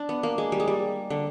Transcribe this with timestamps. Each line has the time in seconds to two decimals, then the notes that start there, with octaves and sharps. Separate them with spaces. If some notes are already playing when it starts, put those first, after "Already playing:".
Already playing: D4
0.09 B3
0.23 A#3
0.38 G#3
0.52 G3
0.60 G#3
0.68 G3
1.10 D3